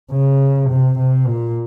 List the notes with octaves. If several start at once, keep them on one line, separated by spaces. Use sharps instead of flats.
C#3
C3
C3
A#2